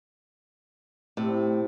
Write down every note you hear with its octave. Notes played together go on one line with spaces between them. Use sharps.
A2 C3